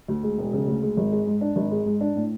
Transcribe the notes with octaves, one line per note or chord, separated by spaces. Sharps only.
D2
G#3
E1
C#3
D2
G#3
G#1
G#3
G#2
D4
G#1
G#3
G#2
D4
A2